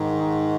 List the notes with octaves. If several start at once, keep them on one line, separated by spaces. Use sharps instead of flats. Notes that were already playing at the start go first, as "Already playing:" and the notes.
Already playing: G#2 D#3